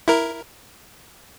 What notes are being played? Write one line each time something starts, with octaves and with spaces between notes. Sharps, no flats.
E4 A#4